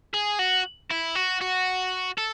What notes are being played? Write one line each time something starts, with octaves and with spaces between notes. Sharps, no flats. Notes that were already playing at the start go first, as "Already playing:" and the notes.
G#4
F#4
E4
F#4
F#4
A4